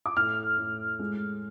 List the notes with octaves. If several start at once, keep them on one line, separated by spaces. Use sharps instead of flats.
D6
A2 F6
A2
G#3